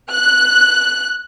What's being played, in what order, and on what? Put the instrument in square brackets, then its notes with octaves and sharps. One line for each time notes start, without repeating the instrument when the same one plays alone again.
[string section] F#6